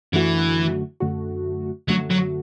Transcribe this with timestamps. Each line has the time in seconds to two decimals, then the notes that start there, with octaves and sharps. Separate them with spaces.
0.13 F#2 D3 E3 A3 F#4
1.00 F#2 D3 A3 F#4
1.89 F#2 D3 F#3 A3 F#4
2.11 F#3